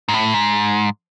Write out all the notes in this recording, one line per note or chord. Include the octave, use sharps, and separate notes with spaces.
G#2
A2
G#2